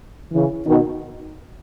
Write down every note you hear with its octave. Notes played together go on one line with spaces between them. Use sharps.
C#3 E3
B2 D#3